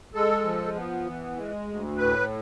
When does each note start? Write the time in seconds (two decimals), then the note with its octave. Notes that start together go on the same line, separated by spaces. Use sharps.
0.14 G#3 A4
0.44 F3
0.75 B3
1.05 E3
1.37 G#3
1.68 D2
1.97 A2 B4